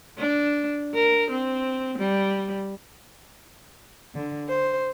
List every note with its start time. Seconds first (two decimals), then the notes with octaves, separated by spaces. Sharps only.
0.18 D4
0.94 A#4
1.31 C4
1.98 G3
4.14 D3
4.47 C5